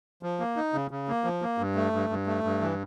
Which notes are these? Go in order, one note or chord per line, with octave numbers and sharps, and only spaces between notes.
F3
A#3
D#4
C#3
C#3
A#3
F3
A#3
G2
A3
G2
G2
A3
G2
E3